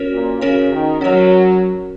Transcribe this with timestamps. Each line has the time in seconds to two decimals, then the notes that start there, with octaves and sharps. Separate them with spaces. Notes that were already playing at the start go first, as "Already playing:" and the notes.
Already playing: C#4 F#4 A#4 C#5
0.13 A#2
0.41 C#3 C#4 F#4 A#4 C#5
0.72 D#3
1.01 F#3 C#4 F#4 A#4 C#5